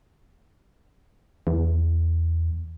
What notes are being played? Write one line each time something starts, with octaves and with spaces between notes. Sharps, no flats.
E2